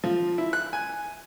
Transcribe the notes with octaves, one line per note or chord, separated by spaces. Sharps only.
F3
E4
F#6
G#5